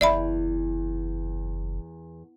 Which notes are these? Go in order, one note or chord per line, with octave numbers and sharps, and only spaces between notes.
F#1 E2 D5 E5 B5